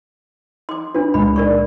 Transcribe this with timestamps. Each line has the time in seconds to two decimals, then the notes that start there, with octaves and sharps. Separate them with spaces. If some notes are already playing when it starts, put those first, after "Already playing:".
0.69 C6 D6
0.95 D4 F4 B4
1.14 C#2 A#2 G#3 B5
1.36 A#4 D5 C#6